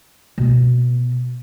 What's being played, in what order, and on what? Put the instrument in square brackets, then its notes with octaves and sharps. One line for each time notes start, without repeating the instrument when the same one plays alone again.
[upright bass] B2 B3